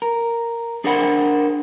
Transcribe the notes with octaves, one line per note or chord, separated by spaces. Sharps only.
A#4
D4 G#4 A#4 C5 F#5 B5